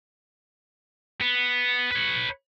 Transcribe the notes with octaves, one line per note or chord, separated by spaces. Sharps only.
B3
B4 C#5